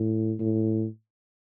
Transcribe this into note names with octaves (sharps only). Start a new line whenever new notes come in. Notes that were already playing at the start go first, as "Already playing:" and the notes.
Already playing: A2
A2